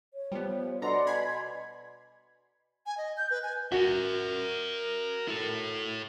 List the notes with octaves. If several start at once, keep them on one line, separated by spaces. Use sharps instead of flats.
C#5
F3 G3 B3
B2 D4 A4 D5 D#5 F#5 A#5 C6
G#5 B5 C6 G#6
G#5
D#5
G6
B4
G#5
F#4 A#4 E5
E4 A4